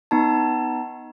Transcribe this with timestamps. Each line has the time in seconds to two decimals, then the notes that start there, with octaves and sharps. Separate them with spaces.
0.11 B3 D#4 A5